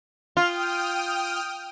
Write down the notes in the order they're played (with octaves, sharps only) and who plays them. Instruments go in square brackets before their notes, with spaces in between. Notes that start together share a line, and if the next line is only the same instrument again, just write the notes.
[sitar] F4 [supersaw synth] G5 D#6 F6